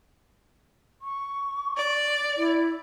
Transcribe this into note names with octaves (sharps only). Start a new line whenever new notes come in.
C#6
D5
E4